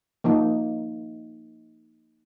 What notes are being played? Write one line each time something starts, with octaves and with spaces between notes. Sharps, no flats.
F3 A#3 D#4